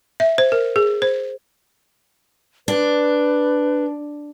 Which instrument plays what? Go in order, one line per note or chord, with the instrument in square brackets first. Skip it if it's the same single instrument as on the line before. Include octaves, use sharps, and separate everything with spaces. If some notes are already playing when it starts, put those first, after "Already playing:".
[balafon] E5
C5
A#4
G#4
C5
[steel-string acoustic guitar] D4 [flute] B4